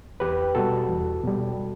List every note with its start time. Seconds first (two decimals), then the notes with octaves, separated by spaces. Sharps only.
0.20 E2 G4 B4
0.55 B2 G3 F#4 A4
0.89 E2
1.23 B2 G3